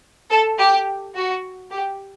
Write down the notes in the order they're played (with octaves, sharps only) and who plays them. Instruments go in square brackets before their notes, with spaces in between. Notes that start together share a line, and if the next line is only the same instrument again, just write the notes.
[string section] A4
G4
F#4
G4